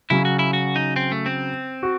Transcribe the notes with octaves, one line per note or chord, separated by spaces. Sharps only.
C#3 F#3 C#4 E4
F#4
E4
F#4
D#4
C4
A3
C4
F#4